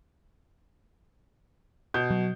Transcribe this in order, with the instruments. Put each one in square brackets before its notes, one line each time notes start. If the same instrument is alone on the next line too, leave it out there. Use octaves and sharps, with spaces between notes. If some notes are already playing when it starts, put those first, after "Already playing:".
[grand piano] B2 G6
[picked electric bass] F#3